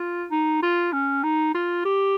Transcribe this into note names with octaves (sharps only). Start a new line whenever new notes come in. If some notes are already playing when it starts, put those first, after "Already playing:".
Already playing: F4
D#4
F4
C#4
D#4
F4
G4